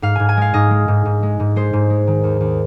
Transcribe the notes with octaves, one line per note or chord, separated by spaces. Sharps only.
G#2 F5
G#2 G#5
G#5
G#3 F5
G#2 D#5
G#3
G#2
G#2
G#3
G#2
G#3 C5
G#2
G#3
D#3
D#2
D#2